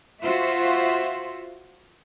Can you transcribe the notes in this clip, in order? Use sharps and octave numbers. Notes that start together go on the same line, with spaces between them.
F4 F#4 C5 E5